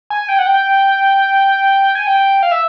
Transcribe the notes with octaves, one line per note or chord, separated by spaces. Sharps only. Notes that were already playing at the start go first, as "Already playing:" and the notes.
G#5
G5
F#5
G5
G#5
G5
F5
E5